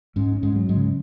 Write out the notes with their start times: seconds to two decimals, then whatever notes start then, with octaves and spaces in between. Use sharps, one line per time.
0.16 G#2 G#3 C#4
0.36 C#4
0.43 G#2 G#3
0.56 F#3
0.69 G#2 G#3
0.75 C#3